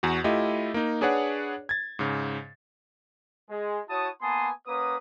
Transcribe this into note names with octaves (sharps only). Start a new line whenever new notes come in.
E2 F#4
A3 E4 F4 G4 D#5
A#3 D#4
D4 G#4 B4 C#5 D5 F#5
G#6 A6
G#2 C#3
G#3
E4 F#4 C#5 A5 D#6
A#3 B3 G#5 A5 C6 D#6
A#3 C#4 B4 F#5 D#6